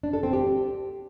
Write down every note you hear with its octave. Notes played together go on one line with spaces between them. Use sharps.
D4
A4
C4
G4